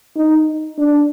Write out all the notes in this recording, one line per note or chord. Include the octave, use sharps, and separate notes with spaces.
D#4
D4